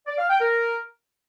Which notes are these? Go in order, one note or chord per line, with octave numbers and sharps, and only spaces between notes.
D5
F5
G5
A#4